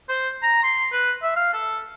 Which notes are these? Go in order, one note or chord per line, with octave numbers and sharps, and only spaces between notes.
C5
A#5
C6
B4
E5
F5
A4